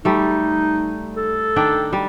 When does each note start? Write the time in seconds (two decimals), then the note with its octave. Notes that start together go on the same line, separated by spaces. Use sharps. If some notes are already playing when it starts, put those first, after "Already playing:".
0.05 G3 A3 D#4
1.16 A4
1.56 D#3 D4 G5
1.93 G3